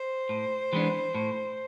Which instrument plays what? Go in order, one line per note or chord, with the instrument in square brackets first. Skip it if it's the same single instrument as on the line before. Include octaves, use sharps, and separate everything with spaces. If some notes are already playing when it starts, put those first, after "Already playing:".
Already playing: [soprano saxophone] C5
[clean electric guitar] A2
E3 G#3 B3 D4
A2